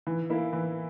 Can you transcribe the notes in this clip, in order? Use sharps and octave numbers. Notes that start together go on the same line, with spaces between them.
E3
A#3 E4
E3